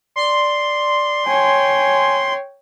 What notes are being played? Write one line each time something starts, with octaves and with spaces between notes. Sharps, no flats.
D5 C6
C#5 G5 G#5